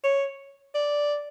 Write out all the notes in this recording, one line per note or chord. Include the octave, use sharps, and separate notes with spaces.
C#5
D5